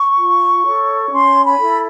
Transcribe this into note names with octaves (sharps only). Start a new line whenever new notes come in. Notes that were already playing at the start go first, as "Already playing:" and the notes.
Already playing: C#6
F4
A4 C#5
C#4 C6
B5
E4 A4